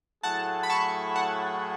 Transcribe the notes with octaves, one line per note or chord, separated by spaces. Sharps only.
A2 F#3 A3 E4 G#4 F#5 A5
B5
A5 C#6
F#5 A5